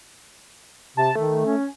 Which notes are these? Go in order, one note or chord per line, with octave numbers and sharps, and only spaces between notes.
C3 A5
D#3 A3
C#4